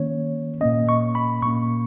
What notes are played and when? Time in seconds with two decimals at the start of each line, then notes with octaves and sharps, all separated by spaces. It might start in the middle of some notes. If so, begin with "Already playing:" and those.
Already playing: D#3 A#3 C#4 C#5
0.61 A#2 A#3 C#4 D#5
0.89 C#6
1.15 B5
1.42 A#2 A#3 C#4 C#6